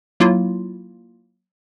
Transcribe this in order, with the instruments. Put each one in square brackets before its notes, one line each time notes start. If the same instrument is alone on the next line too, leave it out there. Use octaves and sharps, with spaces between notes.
[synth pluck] F#3 A#3 E4 F4